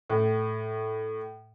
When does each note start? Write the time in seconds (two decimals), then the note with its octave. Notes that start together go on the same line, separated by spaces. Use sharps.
0.10 A2